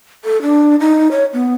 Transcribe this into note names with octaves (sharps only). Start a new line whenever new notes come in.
A4
D4
D#4
C#5
B3